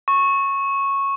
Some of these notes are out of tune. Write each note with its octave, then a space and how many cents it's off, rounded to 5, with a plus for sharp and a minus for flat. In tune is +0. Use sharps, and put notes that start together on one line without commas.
C#6 -10